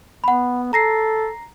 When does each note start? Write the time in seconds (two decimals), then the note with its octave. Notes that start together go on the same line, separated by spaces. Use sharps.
0.24 B3 F#5 B5
0.73 A4 A#5 A#6 C7